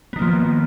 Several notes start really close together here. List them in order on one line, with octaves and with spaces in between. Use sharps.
B3 D#3 A#3 F3